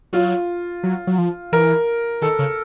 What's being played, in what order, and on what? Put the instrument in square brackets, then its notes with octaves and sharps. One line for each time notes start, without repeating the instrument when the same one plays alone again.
[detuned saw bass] F#3 [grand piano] F4
[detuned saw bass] F#3
F#3
F3
[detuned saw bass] E3 [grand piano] A#4
[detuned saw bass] D#3 [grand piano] A4
[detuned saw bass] C#3